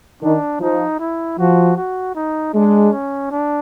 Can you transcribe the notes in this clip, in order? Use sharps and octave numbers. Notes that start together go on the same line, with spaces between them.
D#3 D4
F3 D#4
E4
F3 F#4
F#4
D#4
G#3 D4
C#4
D4